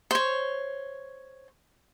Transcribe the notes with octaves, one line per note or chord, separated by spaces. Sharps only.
C5 C#5